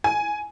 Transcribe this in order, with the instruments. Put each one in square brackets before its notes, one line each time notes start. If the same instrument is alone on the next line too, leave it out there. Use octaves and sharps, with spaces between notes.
[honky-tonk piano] G#5